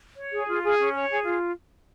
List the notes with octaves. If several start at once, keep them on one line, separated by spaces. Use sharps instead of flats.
C#5
G#4
F4
G#4
C#4
C#5
G#4
F4